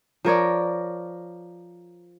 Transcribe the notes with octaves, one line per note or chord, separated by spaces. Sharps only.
F3 A#4 C#5 D5